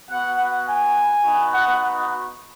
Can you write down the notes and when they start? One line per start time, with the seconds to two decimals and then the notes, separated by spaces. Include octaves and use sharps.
0.10 B3 F#4 F#5
0.38 F#5
0.67 G#5
1.24 B3 D#4 F#4
1.52 F#5